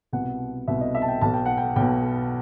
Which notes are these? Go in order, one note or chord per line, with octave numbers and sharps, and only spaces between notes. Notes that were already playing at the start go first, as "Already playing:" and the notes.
C2 B2 F#5
C2 B2 E5
D#5
E5
A5
G5
B1 B2 A5
G5
F#5
G5
B1 B2 G5